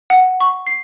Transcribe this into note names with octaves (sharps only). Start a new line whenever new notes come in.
F#5
C#6
C7